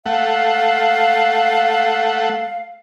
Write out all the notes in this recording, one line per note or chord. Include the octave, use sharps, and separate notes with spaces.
A3 F5 F#5